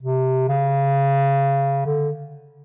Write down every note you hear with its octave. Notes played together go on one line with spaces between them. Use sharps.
C3
C#3
D3